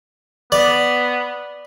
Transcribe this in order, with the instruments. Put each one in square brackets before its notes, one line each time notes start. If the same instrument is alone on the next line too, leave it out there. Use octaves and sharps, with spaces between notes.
[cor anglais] B3 [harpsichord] D5